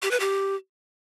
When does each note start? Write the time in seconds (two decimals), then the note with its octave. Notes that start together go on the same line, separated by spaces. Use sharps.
0.02 G4
0.11 B4
0.20 G4